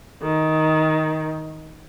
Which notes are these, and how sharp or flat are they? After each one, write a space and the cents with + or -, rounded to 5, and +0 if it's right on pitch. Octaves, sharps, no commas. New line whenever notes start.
D#3 +10